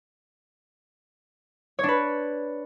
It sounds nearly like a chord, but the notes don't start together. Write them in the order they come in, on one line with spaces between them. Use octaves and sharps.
C#5 D4 B4